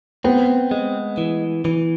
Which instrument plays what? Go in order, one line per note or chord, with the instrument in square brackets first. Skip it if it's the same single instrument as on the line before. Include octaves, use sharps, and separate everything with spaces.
[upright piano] B3 [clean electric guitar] C4
[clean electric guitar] G#3
E3
E3